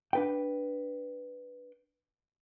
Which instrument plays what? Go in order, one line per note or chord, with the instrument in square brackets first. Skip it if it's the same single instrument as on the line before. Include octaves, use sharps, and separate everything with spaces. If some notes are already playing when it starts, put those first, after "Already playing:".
[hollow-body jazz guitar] D4 B4 G5